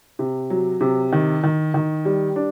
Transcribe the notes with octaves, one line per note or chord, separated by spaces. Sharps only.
C3
F#3
C3
D#3
D#3
D#3
G3
D4